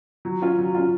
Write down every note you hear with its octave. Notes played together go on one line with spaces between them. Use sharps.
F#3
C#4 F4
F#3
C#4 F4